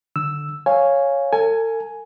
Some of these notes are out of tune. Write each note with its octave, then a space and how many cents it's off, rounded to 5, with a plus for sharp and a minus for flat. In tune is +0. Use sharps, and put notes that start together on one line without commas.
D3 +0 E6 +0
C#5 +0 F5 +0 G#5 +0
A4 +45 G#5 +10